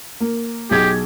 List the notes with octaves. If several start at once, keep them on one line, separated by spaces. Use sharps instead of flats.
A#3
B1 G4 G#4 G#6